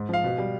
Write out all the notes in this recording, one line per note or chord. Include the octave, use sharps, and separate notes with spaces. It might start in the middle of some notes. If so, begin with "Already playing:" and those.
Already playing: G#2
F3 F5
B2
G3